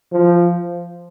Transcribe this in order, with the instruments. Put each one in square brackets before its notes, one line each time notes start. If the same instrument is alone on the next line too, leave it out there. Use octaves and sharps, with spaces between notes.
[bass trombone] F3